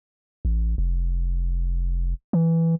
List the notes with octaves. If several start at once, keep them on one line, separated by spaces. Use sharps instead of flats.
A1
F1
E3